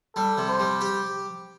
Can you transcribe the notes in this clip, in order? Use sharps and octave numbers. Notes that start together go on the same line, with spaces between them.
G3 A4
C3
C5
G3
G4